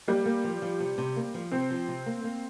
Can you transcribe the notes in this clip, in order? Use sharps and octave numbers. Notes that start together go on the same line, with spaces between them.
G3 A#3
A#3
F3
F3
C3
C3
A#3
F3
C3 C4
F3
C3
A#3
A#3